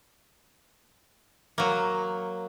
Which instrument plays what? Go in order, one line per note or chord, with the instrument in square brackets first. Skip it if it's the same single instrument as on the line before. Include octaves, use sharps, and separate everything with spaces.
[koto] F#3 A#3